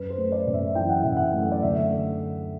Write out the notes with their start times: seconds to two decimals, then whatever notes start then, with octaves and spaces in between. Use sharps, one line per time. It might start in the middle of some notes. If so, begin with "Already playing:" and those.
Already playing: F#2 B4
0.10 C5
0.18 A3
0.32 D5
0.47 F#2
0.54 E5
0.75 E3 G5
0.89 F#5
1.03 F#2 E5
1.17 F#5
1.33 A3
1.52 D5
1.62 D2 E5